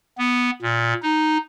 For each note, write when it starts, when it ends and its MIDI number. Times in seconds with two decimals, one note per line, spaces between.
0.18 0.50 59
0.62 0.93 46
1.02 1.38 63